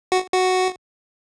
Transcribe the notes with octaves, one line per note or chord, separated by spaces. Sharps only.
F#4
F#4